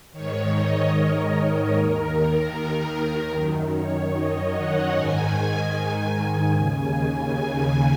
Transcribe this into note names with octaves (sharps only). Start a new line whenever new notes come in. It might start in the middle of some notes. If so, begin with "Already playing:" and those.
G#2 D#3 C#5
D#5
A#4
D#2 D#3
A#4
A#4
F#2 D#3
C#5
D#5
F#5
G#2 D#3 G#5
D#2 C#3 G#5